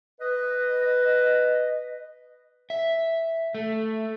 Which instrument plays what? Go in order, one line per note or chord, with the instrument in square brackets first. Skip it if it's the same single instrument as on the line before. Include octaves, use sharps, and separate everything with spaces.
[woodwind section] B4 D#5
[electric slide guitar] E5
A3